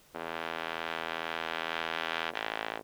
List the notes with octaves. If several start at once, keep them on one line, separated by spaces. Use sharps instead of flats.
E2
A1